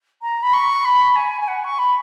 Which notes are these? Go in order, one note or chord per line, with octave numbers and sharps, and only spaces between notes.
A#5
B5
C#6
B5
G#5
G#5
F#5
C#6
B5